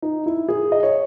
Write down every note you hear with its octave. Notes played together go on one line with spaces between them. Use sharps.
D#4
E4
G#4
D#5
C#5